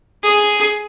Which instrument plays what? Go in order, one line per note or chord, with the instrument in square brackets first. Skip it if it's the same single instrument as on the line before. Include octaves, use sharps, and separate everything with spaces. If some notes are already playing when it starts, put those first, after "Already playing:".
[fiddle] G#4